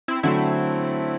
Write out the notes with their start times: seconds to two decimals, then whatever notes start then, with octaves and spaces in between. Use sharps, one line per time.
0.08 C4 E4
0.23 D3 F#3 A3 C4 E4